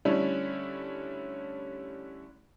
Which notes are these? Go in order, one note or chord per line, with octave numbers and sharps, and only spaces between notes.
D3 G3 A3 C#4 D4 E4